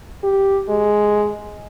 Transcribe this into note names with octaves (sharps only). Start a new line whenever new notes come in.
G4
G#3